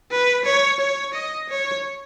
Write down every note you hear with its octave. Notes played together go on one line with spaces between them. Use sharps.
B4
C#5
C#5
D#5
C#5